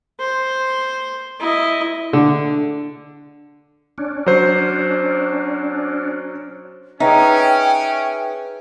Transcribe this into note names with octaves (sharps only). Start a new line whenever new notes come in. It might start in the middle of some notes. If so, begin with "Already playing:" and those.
C5
E4 D#5
D3
C#4 D4
F#3 C5
C#4 D#4 G#4 B4 E5 G5